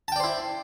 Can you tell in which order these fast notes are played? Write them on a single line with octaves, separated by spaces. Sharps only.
A5 G5 D5 C5 E4